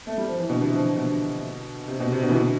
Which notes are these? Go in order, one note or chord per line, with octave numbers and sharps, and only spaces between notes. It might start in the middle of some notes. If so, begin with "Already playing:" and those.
A3
G3
F3
E3
B2 D3
C3 E3
D3 F3
B2 D3
C3
B2
C3
B2 D3
E3
B2 D3